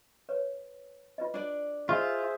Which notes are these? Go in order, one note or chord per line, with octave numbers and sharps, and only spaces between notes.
B4 C#5
F4 B4 D#5
D4 D5
F4 G#4 C5 D#5 E5